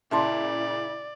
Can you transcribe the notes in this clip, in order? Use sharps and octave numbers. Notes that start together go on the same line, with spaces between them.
A#2 C#3 E4 D5 E5 A5 C6